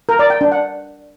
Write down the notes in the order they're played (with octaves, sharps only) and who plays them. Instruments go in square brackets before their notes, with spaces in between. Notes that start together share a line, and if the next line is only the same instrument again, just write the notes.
[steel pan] A#4
D5
G5
D4
F#5